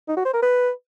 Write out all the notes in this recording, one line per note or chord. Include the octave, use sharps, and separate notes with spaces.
D#4
F#4
C5
A#4
B4